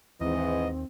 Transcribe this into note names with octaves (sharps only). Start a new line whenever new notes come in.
D#2 G#2 E3 C4 D#5